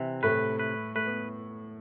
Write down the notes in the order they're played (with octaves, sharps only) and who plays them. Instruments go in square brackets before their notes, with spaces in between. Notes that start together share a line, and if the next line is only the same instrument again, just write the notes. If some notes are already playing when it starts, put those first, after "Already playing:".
Already playing: [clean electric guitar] C3 E3
[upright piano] A2 A3 [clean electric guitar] B4
[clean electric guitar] B4
[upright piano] A3 [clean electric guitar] B4
[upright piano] B3